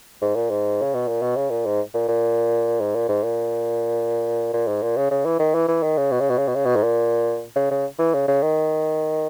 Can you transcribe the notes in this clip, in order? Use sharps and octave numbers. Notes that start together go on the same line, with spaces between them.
G#2
A#2
G#2
C#3
B2
A#2
B2
C#3
A#2
G#2
A#2
A#2
G#2
A#2
G#2
A#2
A#2
G#2
A#2
C#3
C#3
E3
D#3
E3
E3
D#3
C#3
B2
C#3
B2
C#3
B2
C#3
B2
G#2
A#2
C#3
C#3
E3
C#3
C#3
D#3